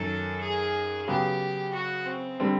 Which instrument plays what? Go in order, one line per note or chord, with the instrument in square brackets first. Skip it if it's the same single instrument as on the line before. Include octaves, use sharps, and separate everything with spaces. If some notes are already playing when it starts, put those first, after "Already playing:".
Already playing: [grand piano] F#2 D#3 F#3 [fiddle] A4
[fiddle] G#4
[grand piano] C#3 F#3 B3 [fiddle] G4
[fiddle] F#4
C4
[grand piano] D3 G3 C4